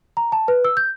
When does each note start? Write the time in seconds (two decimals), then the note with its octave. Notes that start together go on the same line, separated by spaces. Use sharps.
0.17 A#5
0.32 A5
0.48 B4
0.65 E6
0.77 G6